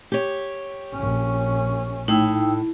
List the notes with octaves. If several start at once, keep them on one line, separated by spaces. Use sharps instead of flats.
G4 C#5
A#1 C#4
A2 D#4 G5 E6